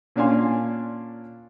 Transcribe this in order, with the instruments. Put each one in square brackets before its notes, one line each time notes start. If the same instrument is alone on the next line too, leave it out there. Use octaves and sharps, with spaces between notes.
[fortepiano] A#2 C#4 D4 F5 G#5 C6